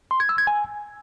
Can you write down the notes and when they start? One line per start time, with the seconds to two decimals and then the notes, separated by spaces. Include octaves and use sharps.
0.11 C6
0.20 G#6
0.29 E6
0.38 G#6
0.47 G#5